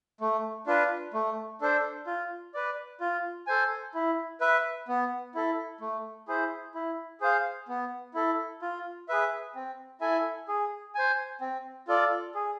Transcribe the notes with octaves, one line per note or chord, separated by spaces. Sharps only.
A3
D4 F4 B4
A3
D4 A4 C5
F4
B4 D5
F4
A4 C5 G#5
E4
B4 E5
B3
E4 A4
A3
E4 G#4 C5
E4
G#4 C5 F5
B3
E4 A4
F4
G#4 B4 E5
C4
E4 A4 E5 G#5
G#4
C5 G#5
C4
F4 A4 D5
G#4